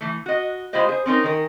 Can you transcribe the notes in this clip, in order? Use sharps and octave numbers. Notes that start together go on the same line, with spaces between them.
E3 A3
F#4 D#5
G#3 E4 F4 G4 C5 D#5
G#4 C5
C4 C#4 D#4 A#4
D#3 A#4 G#5